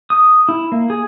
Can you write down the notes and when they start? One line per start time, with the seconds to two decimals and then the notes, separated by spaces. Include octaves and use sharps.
0.10 D#6
0.49 E4
0.72 A#3
0.90 G#4